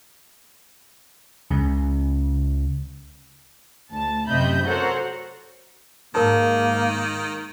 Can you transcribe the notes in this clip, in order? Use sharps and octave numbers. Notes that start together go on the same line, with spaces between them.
C#2 C#3
D2 A5
F#2 C3 D#5 E5 B5 G6
F#4 A4 A#4 C5 C#5 F#5
G#2 D#3 A#3 A#4 A5